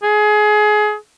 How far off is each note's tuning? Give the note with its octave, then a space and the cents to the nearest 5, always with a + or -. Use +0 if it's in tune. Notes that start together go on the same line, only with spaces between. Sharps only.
G#4 +25